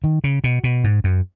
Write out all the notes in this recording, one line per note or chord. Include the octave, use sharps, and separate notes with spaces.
D#3
C#3
B2
B2
G#2
F#2